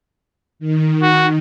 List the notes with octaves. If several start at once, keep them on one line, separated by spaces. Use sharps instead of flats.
D#3
F#4